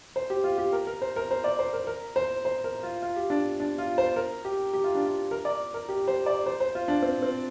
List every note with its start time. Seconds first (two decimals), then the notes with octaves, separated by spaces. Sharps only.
0.16 C5
0.30 G4
0.44 F4
0.58 G4
0.73 A#4
0.87 A#4
1.02 C5
1.16 A#4
1.31 C5
1.44 D5
1.59 C5
1.73 A#4
1.87 A#4
2.16 C5
2.45 C5
2.64 A#4
2.83 F4
3.02 F4
3.16 G4
3.30 D4
3.60 D4
3.78 F4
3.98 C5
4.16 A#4
4.45 G4
4.73 G4
4.84 F4
4.95 D4
5.05 F4
5.31 A#4
5.45 D5
5.74 A#4
5.89 G4
6.08 C5
6.26 D5
6.46 C5
6.60 C5
6.75 F4
6.88 D4
7.02 C4
7.22 C4